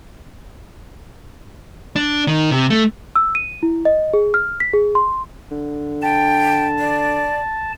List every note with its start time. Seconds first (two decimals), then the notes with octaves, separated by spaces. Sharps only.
1.96 D4
2.27 D#3
2.51 C3
2.70 A3
3.16 E6
3.35 D#7
3.63 E4
3.85 D#5
4.14 G#4
4.34 F6
4.60 B6
4.73 G#4
4.95 C6
5.51 D3
6.02 G5 A5
6.79 D5